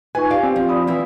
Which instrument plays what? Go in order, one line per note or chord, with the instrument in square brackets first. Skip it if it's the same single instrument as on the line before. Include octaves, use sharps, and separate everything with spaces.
[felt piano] D#4 F4 C#6 [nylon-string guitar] B4 [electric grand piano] G#5
[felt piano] G4 [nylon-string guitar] D5 F5
[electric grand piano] C4
[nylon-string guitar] F3
[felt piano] D5 B5 D#6
[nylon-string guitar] E3 E4 F4